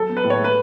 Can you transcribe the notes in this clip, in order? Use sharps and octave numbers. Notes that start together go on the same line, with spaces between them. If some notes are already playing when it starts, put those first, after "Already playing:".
Already playing: F#3 A4
B3
B4
A2
C#5
A3 B4